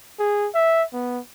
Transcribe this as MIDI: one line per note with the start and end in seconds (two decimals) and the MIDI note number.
0.19 0.48 68
0.54 0.84 76
0.93 1.20 59